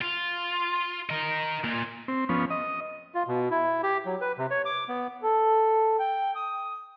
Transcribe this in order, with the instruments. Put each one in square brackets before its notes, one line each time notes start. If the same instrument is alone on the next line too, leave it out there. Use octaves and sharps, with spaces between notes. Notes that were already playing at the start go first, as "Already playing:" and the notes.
[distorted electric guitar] F4
A#4 D#5
A#2 A#3
[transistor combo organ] C4
F3 B3 C#4
D#5
[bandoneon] F4
B2
E4
G4
F#3
B4
C3
C#5
D6
B3
[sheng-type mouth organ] A4
G5
D#6